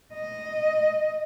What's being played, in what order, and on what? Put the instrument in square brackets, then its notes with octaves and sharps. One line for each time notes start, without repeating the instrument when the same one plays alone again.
[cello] D#5